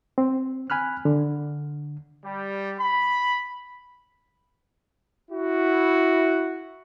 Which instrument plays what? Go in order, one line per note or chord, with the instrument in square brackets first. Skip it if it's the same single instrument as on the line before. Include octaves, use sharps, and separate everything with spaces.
[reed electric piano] C4
G#5 B5 F6 F#6
D3
[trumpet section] G3
B5
[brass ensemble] E4 F#4